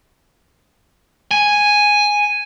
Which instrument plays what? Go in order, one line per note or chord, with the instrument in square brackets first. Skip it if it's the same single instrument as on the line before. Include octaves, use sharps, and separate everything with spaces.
[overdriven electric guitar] G#5